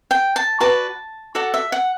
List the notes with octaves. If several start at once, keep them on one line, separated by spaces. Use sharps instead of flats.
G5
A5
F#4 B4 D5 A5
F#4 A4 D5 F#5
E5
F#5